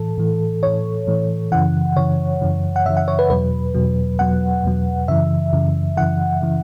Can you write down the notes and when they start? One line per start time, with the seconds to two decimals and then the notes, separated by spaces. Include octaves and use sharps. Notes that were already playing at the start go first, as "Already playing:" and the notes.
Already playing: A2 E3 A4
0.18 A2 E3
0.63 A2 E3 C#5
1.07 A2 E3
1.52 F#2 C#3 E3 F#5
1.96 F#2 C#3 E3 C#5
2.41 F#2 C#3 E3
2.76 F#5
2.86 F#2 C#3 E3 E5
2.97 F#5
3.08 C#5
3.19 B4
3.30 E2 B2 F#3 B4
3.74 E2 B2 F#3
4.19 E2 B2 F#3 F#5
4.64 E2 B2 F#3
5.08 F#2 C#3 E3 E5
5.53 F#2 C#3 E3
5.97 F#2 C#3 E3 F#5
6.42 C#3 E3